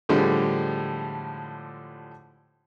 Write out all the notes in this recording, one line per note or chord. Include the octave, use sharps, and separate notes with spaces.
A2 D3 F3 G3 G#3